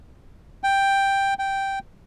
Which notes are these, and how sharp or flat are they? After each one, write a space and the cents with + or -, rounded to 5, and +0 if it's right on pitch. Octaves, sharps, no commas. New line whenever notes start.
G5 +5
G5 -5